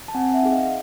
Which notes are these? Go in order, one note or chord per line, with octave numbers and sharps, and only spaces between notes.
A5
C4 F#5 G#5
E5 F#5
D#4 G#4
D#5 F5